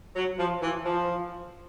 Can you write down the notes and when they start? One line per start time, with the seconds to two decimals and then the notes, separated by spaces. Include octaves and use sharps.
0.15 F#3
0.38 F3
0.62 E3
0.85 F3